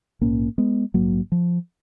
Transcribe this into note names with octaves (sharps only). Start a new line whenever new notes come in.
A#1 G#2 A#3 C#4
G#3 B3
A#1 G#2 F#3 A#3
F3